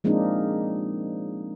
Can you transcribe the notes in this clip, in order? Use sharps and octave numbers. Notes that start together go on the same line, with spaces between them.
F3 G#3 A#3 C4 D4 D#4